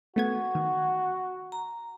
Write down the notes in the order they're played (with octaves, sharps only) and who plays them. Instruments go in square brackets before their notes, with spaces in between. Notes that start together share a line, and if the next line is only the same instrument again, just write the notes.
[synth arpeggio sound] A3 B3 G#6 [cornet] F#4
[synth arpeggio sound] D#3
[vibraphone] A#5